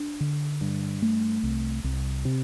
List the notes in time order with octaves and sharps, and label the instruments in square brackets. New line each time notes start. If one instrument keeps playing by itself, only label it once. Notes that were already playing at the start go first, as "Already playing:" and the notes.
Already playing: [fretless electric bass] D4
D3
G2
A3
C2
C2
C3